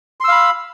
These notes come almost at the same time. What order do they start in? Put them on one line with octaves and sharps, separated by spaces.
C6 E6 F5 B5